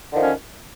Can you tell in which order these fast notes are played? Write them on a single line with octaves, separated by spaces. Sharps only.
D#3 D3 F3 C#4